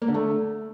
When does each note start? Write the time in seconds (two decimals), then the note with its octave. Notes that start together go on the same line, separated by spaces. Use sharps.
0.02 A#3
0.08 D3
0.14 A3